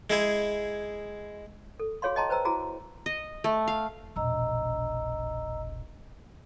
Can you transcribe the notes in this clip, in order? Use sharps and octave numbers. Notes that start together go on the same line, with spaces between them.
G#3 E4 G#4
A4
F#4 G#4 C#5 F5 C6
G#4 D#5 G5 A5 A#5 C6
B4 C5 G5 A#5 E6
E4 F#4 G#4 A#5
D#5
A3
F5
E1 A#1 D#5 A#5 E6